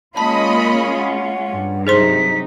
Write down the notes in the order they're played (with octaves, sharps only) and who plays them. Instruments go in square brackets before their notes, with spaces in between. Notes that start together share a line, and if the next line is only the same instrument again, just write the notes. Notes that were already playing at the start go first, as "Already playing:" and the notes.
[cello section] G#3 C#4 F4 [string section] A#3 D#5 B5 [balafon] A5
[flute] A#4
F#5
[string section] G2
[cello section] C3 F#3 D#4 [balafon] G#4 C5 C6 [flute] B6